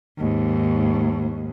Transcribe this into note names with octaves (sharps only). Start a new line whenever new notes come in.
D#2 G#2